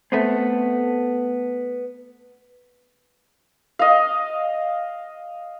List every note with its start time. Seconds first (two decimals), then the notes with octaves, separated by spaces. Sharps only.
0.12 A3 B3 C4
3.79 D#5 F5